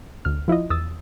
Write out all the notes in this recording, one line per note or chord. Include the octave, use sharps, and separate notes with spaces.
D2 F6
F3 E4 F4 D#5
E2 D#6 E6 A6